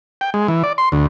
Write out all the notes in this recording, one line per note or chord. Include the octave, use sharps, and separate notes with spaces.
G5
G#3
E3
D5
C6
D2